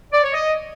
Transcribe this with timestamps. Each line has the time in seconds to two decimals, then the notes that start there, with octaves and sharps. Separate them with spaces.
0.12 D5
0.23 C#5
0.33 D#5